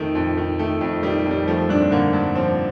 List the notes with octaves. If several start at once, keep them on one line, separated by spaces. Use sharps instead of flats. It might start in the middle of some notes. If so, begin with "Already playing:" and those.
Already playing: F2 D#3 A3
F2
D#3
D#3 A3
F2
D#3 G3
F2
G3
F3 A3
G2 D4
C4
D3 A#3
G2
F3 C4